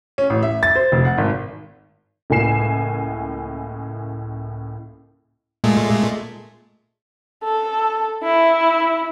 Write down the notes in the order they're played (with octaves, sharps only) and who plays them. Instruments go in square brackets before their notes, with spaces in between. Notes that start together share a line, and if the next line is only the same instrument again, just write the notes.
[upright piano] C#4
A1
E5
A6
C5
F1
F#5
G#1
[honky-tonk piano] C#2 A2 A#3 G#5 C7 E7
[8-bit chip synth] A#2 G#3 A3
[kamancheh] A4
E4